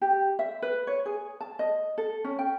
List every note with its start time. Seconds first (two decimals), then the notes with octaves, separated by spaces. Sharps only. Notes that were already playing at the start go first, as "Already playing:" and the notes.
0.01 G4
0.39 E5
0.62 B4
0.87 C#5
1.06 G#4
1.41 A5
1.59 D#5
1.98 A4
2.24 C#4
2.39 G5